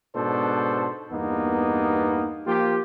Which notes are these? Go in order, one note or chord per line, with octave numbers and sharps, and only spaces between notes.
G#2 B2 D4 A4 C5
E2 G2 A#3 B3 D#4
F3 A#3 F4 G4